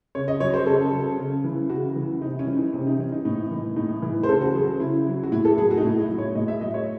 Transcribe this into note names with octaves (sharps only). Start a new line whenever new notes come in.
C#3 C#5
D#5
F#3 C#5
C5
C#3 A4
F#3
C#3
E3
C#3 F#4
E3
C3 D#4
C#4
E3
D#4
C3 C#4
D#4
E3 C#4
D#4
A2 D#4
E3
A2 D#4
E3
C5
C#3 A4
F#4
F#3 G#4
C#3 E4
F#3
F#4
A2 E4
A4
F#3 G#4
F#4
D#4
A2 E4
E4
F#3
C#5
A2 D#5
E5
F#3 D#5
C#5